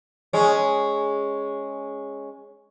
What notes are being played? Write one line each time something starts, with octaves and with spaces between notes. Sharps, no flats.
G#3 C#4